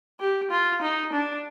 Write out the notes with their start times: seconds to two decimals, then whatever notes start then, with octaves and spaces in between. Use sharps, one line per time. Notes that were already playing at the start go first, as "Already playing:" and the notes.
0.20 G4
0.51 F4
0.82 D#4
1.12 D4